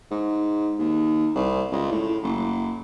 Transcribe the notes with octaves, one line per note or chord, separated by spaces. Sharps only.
G#2
D#2
C2
C#2
A2
F#1